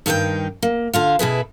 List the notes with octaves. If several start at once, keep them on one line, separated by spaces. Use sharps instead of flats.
G2 D#3 D#4 G#4 G5
A#3
D3 F4 F5
B2 E4 G#4 B4